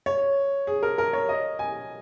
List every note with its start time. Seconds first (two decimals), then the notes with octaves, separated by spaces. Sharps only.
0.06 C#5
0.67 G#4
0.83 A#4
0.98 A#4
1.13 C#5
1.29 D#5
1.59 G#5